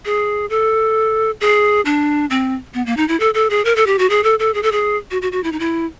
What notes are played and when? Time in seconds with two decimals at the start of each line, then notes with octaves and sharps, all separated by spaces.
0.05 G#4
0.50 A4
1.41 G#4
1.85 D4
2.30 C4
2.74 B3
2.86 A#3
2.97 D#4
3.08 E4
3.20 A4
3.34 A4
3.50 G#4
3.65 A#4
3.76 A4
3.86 G4
3.99 F#4
4.10 G#4
4.24 A4
4.39 A4
4.54 G#4
4.63 A4
4.72 G#4
5.11 F#4
5.22 F#4
5.32 F#4
5.44 E4
5.52 D#4
5.59 E4